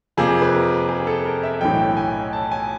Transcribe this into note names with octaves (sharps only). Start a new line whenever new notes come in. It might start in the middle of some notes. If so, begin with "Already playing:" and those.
F2 C3 F3 A#3 G#4
B4
A#4
G#4
A4
A#4
E5
B1 A2 E3 G5
G#5
A5
G#5